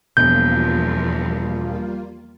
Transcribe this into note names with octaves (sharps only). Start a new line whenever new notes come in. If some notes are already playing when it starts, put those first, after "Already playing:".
E1 E2 F3 G3 A#3 F4 G6